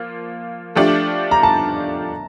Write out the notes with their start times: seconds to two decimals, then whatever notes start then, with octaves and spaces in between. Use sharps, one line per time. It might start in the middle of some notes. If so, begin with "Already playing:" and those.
Already playing: F3 A#3 F4
0.75 F3 A3 D4 G4 D5
1.31 A#5
1.43 A5